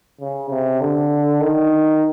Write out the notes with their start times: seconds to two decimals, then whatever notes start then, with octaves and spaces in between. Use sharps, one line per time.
0.21 C#3
0.50 C3
0.81 D3
1.41 D#3